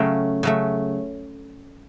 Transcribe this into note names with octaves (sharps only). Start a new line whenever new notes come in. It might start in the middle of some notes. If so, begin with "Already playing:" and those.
Already playing: C#3 F#3 A3 F5 G5
C#3 F#3 A3